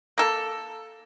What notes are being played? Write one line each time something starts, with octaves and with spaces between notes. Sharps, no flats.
A#3 A4